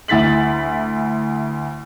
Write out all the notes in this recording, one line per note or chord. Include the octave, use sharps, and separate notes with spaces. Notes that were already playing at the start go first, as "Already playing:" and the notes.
D2 E4 A6 B6 F#7